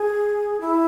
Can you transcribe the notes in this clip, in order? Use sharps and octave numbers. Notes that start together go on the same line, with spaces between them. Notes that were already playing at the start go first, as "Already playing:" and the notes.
Already playing: G#4
E4